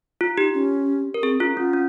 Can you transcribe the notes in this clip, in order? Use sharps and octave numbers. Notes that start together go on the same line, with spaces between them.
F4
D#4 G4
C#4
A#4
C4 G#4
C#4 F4
C#4 F4
C#4